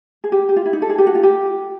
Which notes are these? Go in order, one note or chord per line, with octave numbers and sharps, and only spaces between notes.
G#4
G4
G4
F4
E4
D#4
A4
G#4
G4
F#4
F4
G4